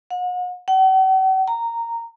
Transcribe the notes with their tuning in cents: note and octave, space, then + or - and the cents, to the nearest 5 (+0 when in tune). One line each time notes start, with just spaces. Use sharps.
F#5 -40
F#5 +45
A#5 -10